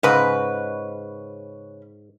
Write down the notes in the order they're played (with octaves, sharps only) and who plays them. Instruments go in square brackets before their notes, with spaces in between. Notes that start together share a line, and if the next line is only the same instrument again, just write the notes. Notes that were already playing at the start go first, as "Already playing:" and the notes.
[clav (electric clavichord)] G#2 [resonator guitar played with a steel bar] C#3 B4